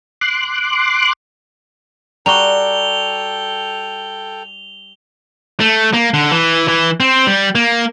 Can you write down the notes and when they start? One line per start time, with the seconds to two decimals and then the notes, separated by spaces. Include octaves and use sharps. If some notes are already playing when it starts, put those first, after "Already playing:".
0.21 C6 D6 F#6
2.26 G3 F#4 A4 G5 A#5 C#6 F7 G7
5.60 A3
5.94 A#3
6.14 D3
6.32 E3
6.68 E3
7.00 C4
7.27 G3
7.55 A#3